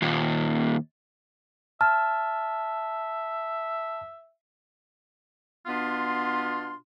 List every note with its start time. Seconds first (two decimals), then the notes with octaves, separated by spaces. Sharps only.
0.02 D#2 A#2
1.81 E5 A5 F6
5.67 B2 B3 D4 F4 C6